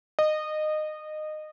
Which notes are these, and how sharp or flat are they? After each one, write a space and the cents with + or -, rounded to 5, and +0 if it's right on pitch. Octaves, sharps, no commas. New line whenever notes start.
D#5 -20